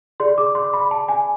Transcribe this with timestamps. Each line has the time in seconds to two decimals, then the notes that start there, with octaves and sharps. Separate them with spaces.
0.20 G#4 D5 C6
0.38 D6
0.55 C6
0.73 B5
0.91 A5
1.08 G#5